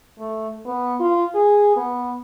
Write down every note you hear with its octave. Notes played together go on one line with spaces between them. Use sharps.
A3
B3
F4
G#4
B3